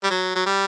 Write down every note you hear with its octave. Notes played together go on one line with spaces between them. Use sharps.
G3
F#3
F#3
G3